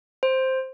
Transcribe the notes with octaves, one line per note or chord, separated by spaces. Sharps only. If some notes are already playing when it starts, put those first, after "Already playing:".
C5